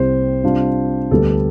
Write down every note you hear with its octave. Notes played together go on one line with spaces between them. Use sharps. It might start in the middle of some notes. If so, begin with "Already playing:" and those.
Already playing: C2 C3 G3 C5
C3 G3 D4 F4
D2 D3 G3 B3 A4